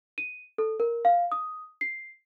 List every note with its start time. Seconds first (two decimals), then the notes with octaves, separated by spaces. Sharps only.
0.18 D#7
0.58 A4
0.80 A#4
1.05 F5
1.32 D#6
1.81 C7